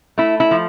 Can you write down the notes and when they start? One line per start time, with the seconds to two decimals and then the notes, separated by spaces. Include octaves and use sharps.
0.18 A3 E4
0.40 E4
0.51 F3